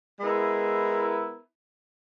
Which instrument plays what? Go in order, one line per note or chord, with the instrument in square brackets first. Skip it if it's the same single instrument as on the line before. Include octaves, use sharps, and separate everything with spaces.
[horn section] G#3 B3 E4 A#4